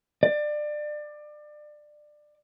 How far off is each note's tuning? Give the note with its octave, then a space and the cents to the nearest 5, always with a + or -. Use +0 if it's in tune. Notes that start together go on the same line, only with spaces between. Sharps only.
D5 +25